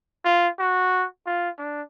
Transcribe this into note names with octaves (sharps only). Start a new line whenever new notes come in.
F4
F#4
F4
D4